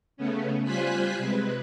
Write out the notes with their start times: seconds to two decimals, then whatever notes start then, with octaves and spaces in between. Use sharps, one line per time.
0.17 C#3 A3 B3 C#4
0.64 G3 F4 C5 G#5 F#6 B6
1.18 C3 G#3 B4